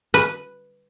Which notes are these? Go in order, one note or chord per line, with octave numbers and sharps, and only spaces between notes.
B4